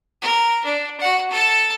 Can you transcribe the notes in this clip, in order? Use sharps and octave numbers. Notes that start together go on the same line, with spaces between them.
A#4
D4
F#4 F#5
A4 A5